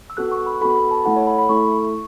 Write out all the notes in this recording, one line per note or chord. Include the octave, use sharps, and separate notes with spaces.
E6
B3 F#4 A4 F#6
C#6
B5
B3 F#4 A4 B5
B5
A5
A3 E4 A4 F#5
C#5
B5
B5
A3 E4 A4 C#6